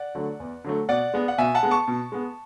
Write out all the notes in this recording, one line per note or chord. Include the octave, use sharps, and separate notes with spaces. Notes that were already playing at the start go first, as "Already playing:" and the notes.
Already playing: D5 F#5
D3 F#3 A3
E2
D3 F#3 A3
B2 D5 F#5
G#3 B3
F#5
B2 E5 G#5
F#5 A5
G#3 B3
A5 C#6
B2
G#3 B3